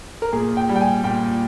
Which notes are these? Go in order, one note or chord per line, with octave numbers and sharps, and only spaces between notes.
A#4
A#2 G#4
G5
G3
G5
G#5
A#2 G5